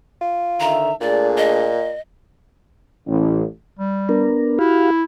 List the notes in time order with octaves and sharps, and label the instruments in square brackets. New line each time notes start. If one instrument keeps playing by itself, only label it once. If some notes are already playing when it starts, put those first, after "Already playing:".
[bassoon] F4
[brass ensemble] D3 D#3 E5 [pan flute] A#5
[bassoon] A#2 [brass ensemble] A3 D4 G#4 [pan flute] D5
[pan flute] D#5
[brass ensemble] A1
[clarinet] G3
[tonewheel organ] B3 D4 A#4
[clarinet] E4 [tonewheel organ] F#4 G4 F5